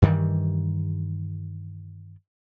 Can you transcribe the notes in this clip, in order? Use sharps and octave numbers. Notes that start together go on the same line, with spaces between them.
G2 D#3 E3 G3